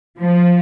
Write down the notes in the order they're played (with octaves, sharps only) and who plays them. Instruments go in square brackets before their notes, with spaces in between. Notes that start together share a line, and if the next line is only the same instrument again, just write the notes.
[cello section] F3